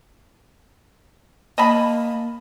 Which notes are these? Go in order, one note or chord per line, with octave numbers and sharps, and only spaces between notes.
A#3 D#5 A5 B5